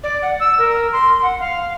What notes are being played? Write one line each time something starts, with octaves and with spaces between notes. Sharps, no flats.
D5
F#5
E6
A#4
C6
F#5
F5